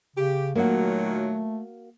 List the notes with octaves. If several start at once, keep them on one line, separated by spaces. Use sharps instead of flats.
C#3 G4
A#2 D#3 F#3 A3 A#3 F#4